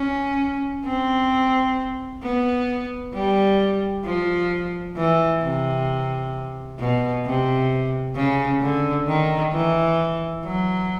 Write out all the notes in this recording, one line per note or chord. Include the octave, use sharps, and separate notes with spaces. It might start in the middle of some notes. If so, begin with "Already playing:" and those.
Already playing: C#4
C4
B3
G3
F3
E3
C3
B2
C3
C#3
D3
D#3
E3
F#3